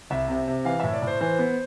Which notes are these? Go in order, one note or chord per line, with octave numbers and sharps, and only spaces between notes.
C2 E5
C3
C3
E3 F5
A2 E5
D5
A2
C5
E3 C5
B3